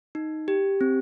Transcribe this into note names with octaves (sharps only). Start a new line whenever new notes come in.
D#4
G4
C4